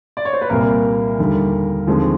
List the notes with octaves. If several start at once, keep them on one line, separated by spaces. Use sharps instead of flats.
D5
C#5
C5
B4
C2 A#2 G3 A#3 A#4
D#2 D3 G3 A#3
D#2 D3 F3 G#3 C4